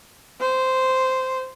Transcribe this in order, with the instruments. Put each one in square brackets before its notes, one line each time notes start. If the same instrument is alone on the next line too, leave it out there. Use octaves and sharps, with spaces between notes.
[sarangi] C5